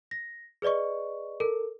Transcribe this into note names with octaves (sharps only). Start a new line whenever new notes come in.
A#6
G#4 B4 D5 D#5 C#6
A4 A#4